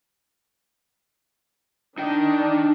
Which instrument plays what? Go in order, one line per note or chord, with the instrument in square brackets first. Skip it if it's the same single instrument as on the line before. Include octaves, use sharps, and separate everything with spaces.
[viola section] D4 [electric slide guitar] D#4 G5